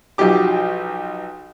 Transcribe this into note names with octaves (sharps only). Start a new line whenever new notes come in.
B1 F3 F#3 G4 D6